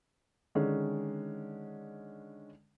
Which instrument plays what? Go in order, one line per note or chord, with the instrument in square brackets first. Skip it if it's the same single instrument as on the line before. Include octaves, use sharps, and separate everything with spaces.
[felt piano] D3 D#3 G#3 C#4